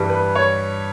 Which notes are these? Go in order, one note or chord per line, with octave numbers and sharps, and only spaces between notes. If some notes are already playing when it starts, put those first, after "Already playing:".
Already playing: G2 E3 G3
B4
C#5